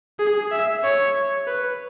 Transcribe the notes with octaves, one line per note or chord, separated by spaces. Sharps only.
G#4
E5
C#5
B4